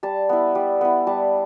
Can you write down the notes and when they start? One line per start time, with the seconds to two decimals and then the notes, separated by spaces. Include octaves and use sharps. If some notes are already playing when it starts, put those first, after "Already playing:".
0.03 G3 A5
0.29 B3 E4
0.55 G3
0.81 B3 E4
1.07 G3 A5